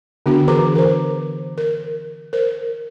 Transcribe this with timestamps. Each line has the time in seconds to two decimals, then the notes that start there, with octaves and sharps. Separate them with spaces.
0.26 D3 B3 D4 F#4
0.48 E3 G#4 A#4 B4 A#5 D6
0.75 A#4 C5
1.58 A#4
2.33 A#4 C5